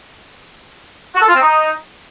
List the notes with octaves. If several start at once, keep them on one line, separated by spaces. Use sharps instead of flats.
F#4
A4
F4
C4
D#4